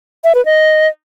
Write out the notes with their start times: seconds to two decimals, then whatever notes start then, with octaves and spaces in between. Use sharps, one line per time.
0.24 E5
0.35 B4
0.45 D#5